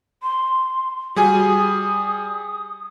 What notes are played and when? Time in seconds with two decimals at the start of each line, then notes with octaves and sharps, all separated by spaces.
0.22 C6
1.16 G3 F#4 G#4 G#5
1.39 D#6